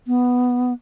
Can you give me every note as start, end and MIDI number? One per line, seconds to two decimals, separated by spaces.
0.07 0.73 59